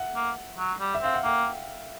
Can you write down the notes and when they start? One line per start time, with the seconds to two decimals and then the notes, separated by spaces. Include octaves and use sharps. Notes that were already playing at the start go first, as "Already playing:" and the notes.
Already playing: E5 F#5
0.16 A#3
0.58 F#3
0.80 G3
0.94 E5
1.02 C4 F5
1.14 F#5
1.24 A#3 G5